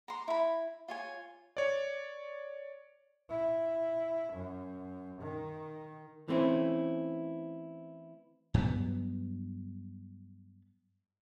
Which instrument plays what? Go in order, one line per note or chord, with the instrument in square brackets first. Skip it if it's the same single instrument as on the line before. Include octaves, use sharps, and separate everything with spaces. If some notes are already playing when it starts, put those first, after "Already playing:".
[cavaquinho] A#5 C6
E4 B5
F4 C#5 G#5
[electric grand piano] C#5 D5
[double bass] E4
F#2
D#3
[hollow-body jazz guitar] E3 A3 C4 C#4 E4
[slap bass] G2 F#3 B3